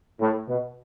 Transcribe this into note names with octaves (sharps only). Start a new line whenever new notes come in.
A2
B2